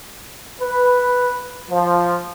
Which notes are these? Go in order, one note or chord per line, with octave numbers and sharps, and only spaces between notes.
B4
F3